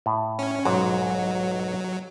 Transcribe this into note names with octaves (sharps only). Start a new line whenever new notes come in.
A2
C#4
B1 G#2 F#3